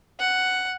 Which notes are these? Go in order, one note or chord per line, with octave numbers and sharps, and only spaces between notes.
F#5